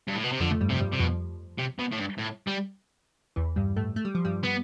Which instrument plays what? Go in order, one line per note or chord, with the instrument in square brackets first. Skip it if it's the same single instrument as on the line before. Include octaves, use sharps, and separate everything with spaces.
[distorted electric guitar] G2
A2
B2
C3
[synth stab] F2 F3 [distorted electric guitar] D3
[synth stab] A3
G2 G3
[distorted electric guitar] C3 [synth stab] F3
[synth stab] G2 G3
[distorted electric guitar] C3
[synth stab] F2 F3 [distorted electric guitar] B2
[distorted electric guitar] C3
B2
A2
G2
A2
G3
[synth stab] E2 E3
G2 G3
A2 A3
A3
G3
F3
G2 G3
[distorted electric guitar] B3